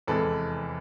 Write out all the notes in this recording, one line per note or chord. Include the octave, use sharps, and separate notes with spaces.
F1 E2 C3 E3 G#3 A4 B4